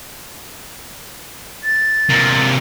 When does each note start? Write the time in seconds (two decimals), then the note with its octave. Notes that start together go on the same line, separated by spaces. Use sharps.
1.64 A6
2.09 C3 A#3